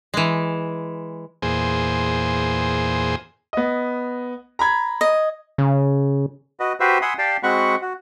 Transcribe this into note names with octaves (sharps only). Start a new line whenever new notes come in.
E3 G#3
E2 A#2 G#4 C5
B3 D#5
A#5 B5 G#6
D#5
C#3
F#4 B4 D#5
F#4 G4 B4 C5 E5
E5 F#5 G#5 B5 C6 D#6
G4 D5 F5 G5 A5
G#3 C4 F#4 F#5 B5 C#6
F#4